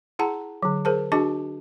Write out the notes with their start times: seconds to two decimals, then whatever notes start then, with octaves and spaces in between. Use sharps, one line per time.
0.19 E4 G#4 F#5 A5 A#5
0.63 D3 F#3
0.85 G#4 A#4 C5 A5
1.12 D4 F#4 G#4 D#5 A5 D6